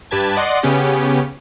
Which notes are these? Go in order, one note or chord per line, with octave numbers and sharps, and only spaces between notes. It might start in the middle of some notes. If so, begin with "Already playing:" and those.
G2 G4 B4 A5 G#6
D5 D#5 F#5 C6
C#3 B3 C#4 G4